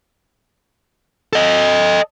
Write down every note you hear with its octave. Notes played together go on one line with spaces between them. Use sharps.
A4 D#5